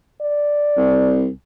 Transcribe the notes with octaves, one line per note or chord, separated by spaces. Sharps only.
D5
C2